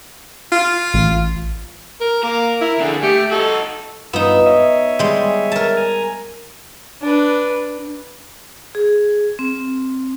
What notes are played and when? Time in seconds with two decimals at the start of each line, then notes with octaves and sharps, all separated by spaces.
0.52 F4
0.94 A1
2.01 A#4
2.23 A#3 A#4
2.61 E4
2.80 D3 D4 G#4
3.03 A3 G4
3.31 D#4 F#4 A4
4.13 G2 B3 D#4 F4 E6
4.46 C#5 D#5 E5
4.99 G3 G#3
5.52 A#4 A5
5.77 G#5 A#5
7.01 D4 B4
8.75 G#4
9.39 C4